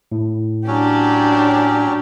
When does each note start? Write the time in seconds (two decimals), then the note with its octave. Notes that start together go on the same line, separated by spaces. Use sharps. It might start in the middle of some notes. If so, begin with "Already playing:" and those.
0.12 A2
0.67 F#3 C#4 D4 G4